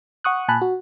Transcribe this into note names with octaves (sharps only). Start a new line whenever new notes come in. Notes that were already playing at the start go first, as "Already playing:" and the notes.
F#5 C#6 D#6 F#6
A#2 G#5 A5 B5 F#6
F#4